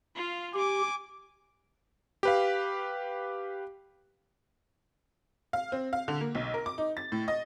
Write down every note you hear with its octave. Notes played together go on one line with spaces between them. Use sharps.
F4 F5
G4 G#5 D6
G4 B4 F5
F5
C4
F5
D3
A#3
B1
A#4
D6
D#4
A6
A2
D#5